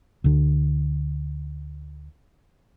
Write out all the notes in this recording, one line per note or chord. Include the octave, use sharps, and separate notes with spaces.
D2 D3